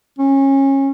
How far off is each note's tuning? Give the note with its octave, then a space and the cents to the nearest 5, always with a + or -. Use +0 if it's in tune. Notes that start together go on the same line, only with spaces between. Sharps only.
C#4 -25